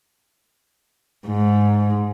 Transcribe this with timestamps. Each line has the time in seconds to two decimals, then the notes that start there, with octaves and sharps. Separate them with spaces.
1.27 G#2